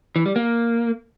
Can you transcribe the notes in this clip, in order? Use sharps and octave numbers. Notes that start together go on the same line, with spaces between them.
E3
G3
A#3